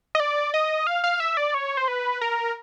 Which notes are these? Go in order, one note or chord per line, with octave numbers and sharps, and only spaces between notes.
D#5
D5
D#5
F5
F5
E5
D5
C#5
C5
B4
A#4